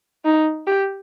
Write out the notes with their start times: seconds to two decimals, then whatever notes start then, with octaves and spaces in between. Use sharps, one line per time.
0.25 D#4
0.67 G4